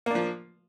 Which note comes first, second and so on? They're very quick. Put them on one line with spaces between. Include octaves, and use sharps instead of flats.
A#3 D4 F3